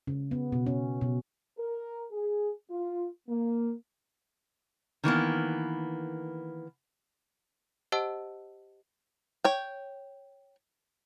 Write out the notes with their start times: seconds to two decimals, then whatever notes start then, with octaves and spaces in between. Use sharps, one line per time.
0.07 C#3
0.31 B3
0.52 B2
0.66 C#4
1.01 B2
1.59 A#4
2.12 G#4
2.71 F4
3.29 A#3
5.04 D#3 E3 A#3 B3
7.92 G4 C5 D#5 F#5 A5 E6
9.44 C#5 G5